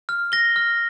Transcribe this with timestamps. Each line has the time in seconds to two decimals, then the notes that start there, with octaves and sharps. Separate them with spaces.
0.09 F6
0.32 A#6 G7
0.56 F6